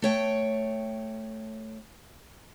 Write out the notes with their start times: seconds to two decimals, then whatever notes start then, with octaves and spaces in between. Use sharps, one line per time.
0.02 A3 C#5 G5